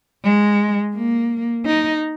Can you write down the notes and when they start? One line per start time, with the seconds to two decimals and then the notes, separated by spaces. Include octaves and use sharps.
0.24 G#3
0.95 A#3
1.66 D#4